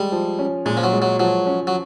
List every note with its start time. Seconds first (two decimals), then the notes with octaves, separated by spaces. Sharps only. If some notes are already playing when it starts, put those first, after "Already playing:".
Already playing: G3 G#3
0.12 F3
0.39 C#4
0.65 A#2 G#3
0.77 F3
0.84 F#3
0.93 G#3
1.02 F#3
1.19 F3 F#3
1.46 C#4
1.67 F#3